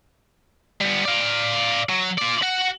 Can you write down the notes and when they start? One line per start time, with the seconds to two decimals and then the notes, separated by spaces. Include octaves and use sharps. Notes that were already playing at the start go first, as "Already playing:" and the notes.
0.81 G3 B3
1.05 D5 F5
1.89 F#3
2.18 F4 D5
2.43 F#4